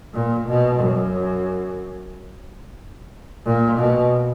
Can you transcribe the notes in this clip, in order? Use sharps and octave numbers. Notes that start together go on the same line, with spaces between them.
A#2
B2
F#2
A#2
B2